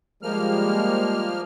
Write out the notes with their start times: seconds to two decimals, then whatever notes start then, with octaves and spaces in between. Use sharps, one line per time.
0.23 F3 G3 G#3 A#3 F6